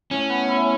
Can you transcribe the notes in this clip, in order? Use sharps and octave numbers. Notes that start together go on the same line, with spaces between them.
A2 C#4
B3
E4